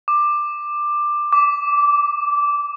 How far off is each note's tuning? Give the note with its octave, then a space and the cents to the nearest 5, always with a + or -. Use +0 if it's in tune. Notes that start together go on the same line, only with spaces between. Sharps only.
D6 +15
D6 -15